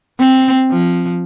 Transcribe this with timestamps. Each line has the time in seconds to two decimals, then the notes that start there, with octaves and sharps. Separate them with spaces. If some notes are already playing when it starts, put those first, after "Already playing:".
0.19 C4
0.71 F3